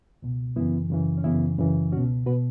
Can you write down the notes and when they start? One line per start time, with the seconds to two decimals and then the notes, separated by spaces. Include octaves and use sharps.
0.22 C#2 B2
0.56 F#2 C#3 E3 B3 E4
0.90 F#2 C#3 E3
1.18 C#4
1.24 F#2 C#3 E3 B3 E4
1.58 F#2 C#3 E3
1.92 C#2 B2 C#4 F#4
2.26 B2 F#4 B4